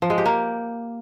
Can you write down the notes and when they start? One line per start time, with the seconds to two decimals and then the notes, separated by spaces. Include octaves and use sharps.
0.02 F3
0.10 G#3
0.18 G4
0.26 A#3